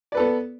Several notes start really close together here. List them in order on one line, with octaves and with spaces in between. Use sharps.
D5 B4 A4 B3